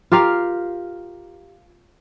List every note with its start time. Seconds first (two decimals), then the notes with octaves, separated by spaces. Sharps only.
0.12 F4 G4 A#4 F5